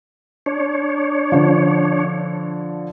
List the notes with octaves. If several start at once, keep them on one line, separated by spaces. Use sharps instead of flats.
D4 C#5
D3 F3